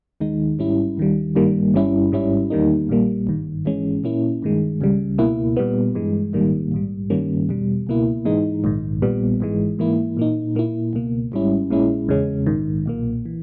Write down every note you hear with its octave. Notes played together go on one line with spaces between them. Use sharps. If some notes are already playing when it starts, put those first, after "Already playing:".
D#2 D#3 G#3 D#4
G#1 G#2 G3 C#4 E4
D#2 D#3 G3
G#1 G2 D#3 G3 A#3
G1 G2 G3 C#4 E4
G#1 G#2 G3 C#4 E4
E2 D#3 G3 A#3 D#4
A#1 A#2 G3 A#3
G#1 G2 D#3
G#1 G#2 E3 G#3 C#4
A#2 A#3 C#4 E4
G2 D#3 G#3
C#2 C#3 G3
C#2 B2 A#3 E4
A#2 G3 B3
G2 E3 G#3
A#1 G#2 D#3 G3 A#3
A#1 G#2 G3
G2 D#3 G3 A#3 C#4
E2 B2 G3
C#2 B2 A#3 E4
G#2 E3 G#3 D#4
A#1 G#2 D#3
A#1 A#2 G3 B3
G#1 G#2 E3 G#3
G#2 E3 A#3 E4
A#2 A#3 D#4
A#2 A#3 E4
C#2 B2 A#3
G#1 G#2 G3 C#4 E4
A#1 A#2 G#3 C#4 E4
E2 C#3 G#3 C#4
A#1 G#2 D#3
B1 A#2 A#3
E3